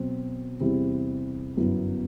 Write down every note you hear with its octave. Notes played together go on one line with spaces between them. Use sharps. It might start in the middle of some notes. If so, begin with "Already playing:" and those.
Already playing: B2 F#3 C4
E2 C3 G3 C4 E4
G1 F#2 F#3 B3 E4